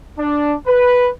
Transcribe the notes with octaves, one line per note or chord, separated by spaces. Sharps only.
D4
B4